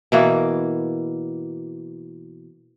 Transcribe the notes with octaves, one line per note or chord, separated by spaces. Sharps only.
B2 E3 A#3